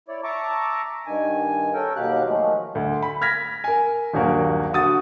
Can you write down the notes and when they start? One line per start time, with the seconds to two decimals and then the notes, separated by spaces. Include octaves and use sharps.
0.08 E4 C#5 D5
0.24 E5 A5 A#5 C#6 D6
1.06 G2 D#3 G#5
1.74 C#4 A4 A#4 G5
1.96 D#2 B2 F#3 G4 F5 F#6
2.26 D#3 F3 F#3 G#3 A3
2.75 D2
3.03 B5
3.22 F6 G#6 A#6 B6
3.64 A#4 G#5
4.13 D#1 G2 F#3 A#3 F#4 A#4
4.73 D3 F#4 D#6 A6